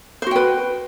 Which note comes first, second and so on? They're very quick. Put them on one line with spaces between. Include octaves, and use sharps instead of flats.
C5 F#4 G5 B4